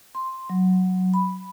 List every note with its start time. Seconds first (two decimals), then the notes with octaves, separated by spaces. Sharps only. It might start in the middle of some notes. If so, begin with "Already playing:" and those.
0.15 C6
0.50 F#3
1.14 B5